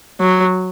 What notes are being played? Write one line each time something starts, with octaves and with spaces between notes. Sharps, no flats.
F#3